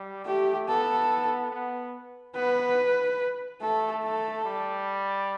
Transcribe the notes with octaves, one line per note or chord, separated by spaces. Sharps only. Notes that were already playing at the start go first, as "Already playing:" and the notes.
Already playing: G3
A3 G4
B3 A4
B3
B3 B4
A3 A4
A4
G3